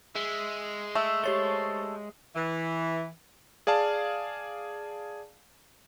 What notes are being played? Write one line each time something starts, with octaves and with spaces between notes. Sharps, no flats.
G#3 E5
A3 E5
G4 A4 C5 C#5 C#6 G7
E3
G#4 D5 F5 A5